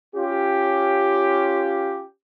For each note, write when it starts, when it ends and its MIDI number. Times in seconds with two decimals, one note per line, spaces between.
0.15 2.05 61
0.15 2.05 65
0.15 2.05 67